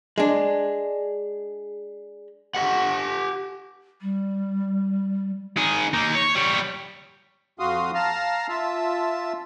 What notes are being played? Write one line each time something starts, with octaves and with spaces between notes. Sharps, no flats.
G#3 D4
G4 F#5
G3
D#3 G#4
A#3 D#4
C#5
G3 C#5
F2 F#4 F5 C6 D#6
F5 A5 A#5 F6
F4 E5 A5